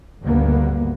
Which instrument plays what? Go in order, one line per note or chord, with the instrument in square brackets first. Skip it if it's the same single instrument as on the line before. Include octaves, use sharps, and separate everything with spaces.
[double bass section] G#1 D2 G2 A#3 B3